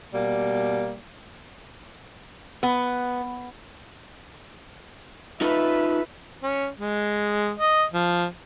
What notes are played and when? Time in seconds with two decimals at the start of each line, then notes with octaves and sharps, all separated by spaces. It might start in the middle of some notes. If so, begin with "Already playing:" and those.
0.14 B2 G3 A#3
2.63 B3
5.41 D#4 F4 A4 B4 E5
6.43 C#4
6.79 G#3
7.59 D#5
7.93 F3